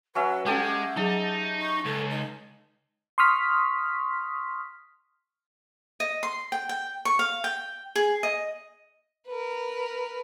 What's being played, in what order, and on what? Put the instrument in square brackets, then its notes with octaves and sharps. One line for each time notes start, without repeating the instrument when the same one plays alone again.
[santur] F#3 C#4 E5 [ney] B4
[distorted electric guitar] G#3 [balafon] C#4 A4 G5 [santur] G4 A5 [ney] F#5
[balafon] F#3 G#4 [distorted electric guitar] D#4 [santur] A5
[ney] C#6
[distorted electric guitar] C#2 [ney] A4
[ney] D#4
[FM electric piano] C6 C#6 D#6 F6 B6
[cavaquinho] D#5
C6
G5
G5
C#6
F5
G5
G#4
D#5
[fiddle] A#4 B4